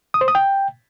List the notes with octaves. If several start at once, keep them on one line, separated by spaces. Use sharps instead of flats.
D#6
C5
D#6
G5